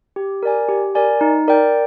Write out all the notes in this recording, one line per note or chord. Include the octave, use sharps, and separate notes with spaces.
G4
A#4 D5 G#5
G4
A#4 D5 G#5
D#4
A#4 D5 G5